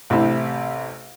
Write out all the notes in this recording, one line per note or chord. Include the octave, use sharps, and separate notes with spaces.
A1 C3 E4